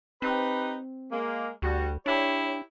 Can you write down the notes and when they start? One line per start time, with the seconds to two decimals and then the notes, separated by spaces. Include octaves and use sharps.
0.22 C4 D#4 G4 B4
1.12 G#3 A#3
1.62 D2 G3 F#4
2.06 D4 E4 G4 C#5